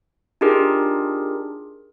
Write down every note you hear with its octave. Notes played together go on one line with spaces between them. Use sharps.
D4 D#4 F4 G4 G#4 A#4